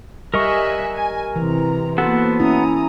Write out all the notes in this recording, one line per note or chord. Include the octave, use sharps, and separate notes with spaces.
G3 A#4 D#5 E5 G#5 C#6 F#6
G#5
C3 E3 A#5
A#3 B3 F#4 A4 C5
C#4 E4 A#5 D#6